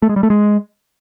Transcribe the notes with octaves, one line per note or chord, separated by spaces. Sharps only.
A3
G#3
G3
A3
G#3